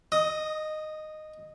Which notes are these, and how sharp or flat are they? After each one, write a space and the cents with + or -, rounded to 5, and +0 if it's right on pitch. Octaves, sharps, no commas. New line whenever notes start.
D#5 -10 D#6 +15